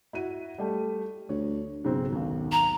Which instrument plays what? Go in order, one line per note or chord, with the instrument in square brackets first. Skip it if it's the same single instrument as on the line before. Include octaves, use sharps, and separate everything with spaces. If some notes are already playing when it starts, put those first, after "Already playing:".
[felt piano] E4 F#4 D#7
G3 A3
[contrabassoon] D2 [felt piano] C#5
[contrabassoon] B1 [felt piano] G#2 C#3 C4
[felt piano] G#1 D#2
[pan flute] A#5